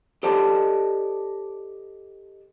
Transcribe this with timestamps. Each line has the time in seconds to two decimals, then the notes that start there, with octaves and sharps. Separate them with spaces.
0.23 G4 A4 C5 D5 D#5 A5